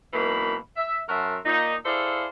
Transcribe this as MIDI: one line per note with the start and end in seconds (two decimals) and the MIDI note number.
0.13 0.56 42
0.13 0.56 47
0.13 0.56 52
0.13 0.56 58
0.13 0.56 63
0.13 0.56 83
0.77 1.01 76
1.09 1.38 42
1.09 1.38 66
1.09 1.38 70
1.09 1.38 76
1.09 1.38 81
1.09 1.38 84
1.45 1.76 46
1.45 1.76 63
1.85 2.26 64
1.85 2.26 68
1.85 2.26 69
1.85 2.26 72
1.85 2.26 74
1.85 2.26 77